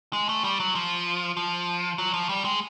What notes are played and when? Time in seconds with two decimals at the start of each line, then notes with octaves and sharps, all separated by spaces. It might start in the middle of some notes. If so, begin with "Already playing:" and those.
0.13 G#3
0.29 A3
0.44 G3
0.60 F#3
0.75 F3
1.37 F3
1.98 F#3
2.14 F3
2.29 G3
2.45 G#3